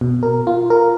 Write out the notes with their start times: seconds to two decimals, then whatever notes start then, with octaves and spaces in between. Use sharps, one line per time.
0.01 B2
0.23 A#4
0.47 F4
0.70 A#4